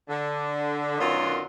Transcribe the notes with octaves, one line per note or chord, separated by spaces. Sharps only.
D3
F#2 B2 D3 D#3 F#3 F4